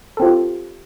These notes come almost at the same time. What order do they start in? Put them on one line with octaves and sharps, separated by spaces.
A4 C4 F4 G4